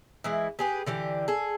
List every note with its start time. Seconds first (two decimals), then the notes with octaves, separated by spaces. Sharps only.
0.24 E3 G#3 E4
0.59 G4 G#4 B4
0.86 D3 E3 G4
1.28 G#4 A4